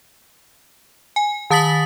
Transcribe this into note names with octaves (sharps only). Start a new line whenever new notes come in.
G#5
D#3 A5 D#6 A6 B6 F#7